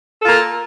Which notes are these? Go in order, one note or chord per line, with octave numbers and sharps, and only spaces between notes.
A#3 F4 A4